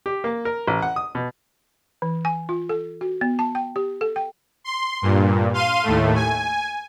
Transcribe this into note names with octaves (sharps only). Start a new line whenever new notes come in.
G4
A#3
A#4
A1
F#5
D#6
B2
E3
G#5
F4
A4
F#4
B3
A5
G5
G4
A4
G5
C6
G2 A#2
F5 C6 D#7
D#2 A2 A3
G#5